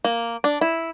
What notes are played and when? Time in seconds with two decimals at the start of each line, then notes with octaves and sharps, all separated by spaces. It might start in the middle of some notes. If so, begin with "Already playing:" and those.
0.05 A#3
0.44 D4
0.61 E4